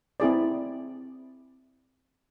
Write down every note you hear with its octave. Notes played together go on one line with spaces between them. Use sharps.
C4 E4 G#4 D5